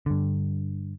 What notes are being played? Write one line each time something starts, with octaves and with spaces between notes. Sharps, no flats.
G2 D3